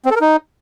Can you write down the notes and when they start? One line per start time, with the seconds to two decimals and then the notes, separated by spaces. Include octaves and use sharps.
0.05 C4
0.11 A4
0.16 A#4
0.21 D#4